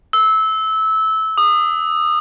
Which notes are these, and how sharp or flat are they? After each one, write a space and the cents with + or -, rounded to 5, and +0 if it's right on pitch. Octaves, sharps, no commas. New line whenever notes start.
E6 -20
D#6 -30